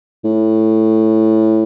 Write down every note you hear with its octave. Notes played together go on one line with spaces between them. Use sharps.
A2